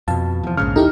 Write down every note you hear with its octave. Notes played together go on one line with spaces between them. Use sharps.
F2 B2 F5 A5
E2 F3
A#1 G#2 C#3 F6
D#2 D#4 E4 G4 A4